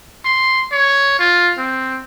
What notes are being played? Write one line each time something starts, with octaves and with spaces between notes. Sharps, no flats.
C6
C#5
F4
C4